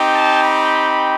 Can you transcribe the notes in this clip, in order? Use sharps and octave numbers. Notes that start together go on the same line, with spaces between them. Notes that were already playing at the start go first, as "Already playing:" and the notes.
Already playing: C4 D#4 G4
A5
B5